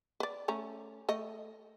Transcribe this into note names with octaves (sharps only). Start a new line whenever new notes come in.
B4 D5
A3 C#4 A#5
A3 D#5